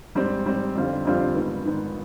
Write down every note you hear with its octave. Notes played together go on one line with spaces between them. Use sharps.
G#2 G3 C4
G#2 G3 C4
F2 D3 G3 C4 F4
F2 D3 G3 C4 F4
G#2 D#3 B3
G#2 D#3 B3